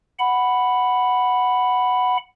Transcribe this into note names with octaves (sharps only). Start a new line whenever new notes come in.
F#5 B5